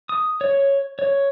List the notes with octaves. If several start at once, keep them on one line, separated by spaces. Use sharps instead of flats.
D#6
C#5
C#5